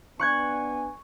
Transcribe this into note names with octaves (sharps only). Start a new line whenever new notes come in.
B3 D4 G#5 C#6 F#6 G#6